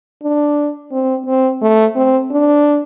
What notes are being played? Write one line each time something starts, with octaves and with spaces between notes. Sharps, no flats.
D4
C4
C4
A3
C4
D4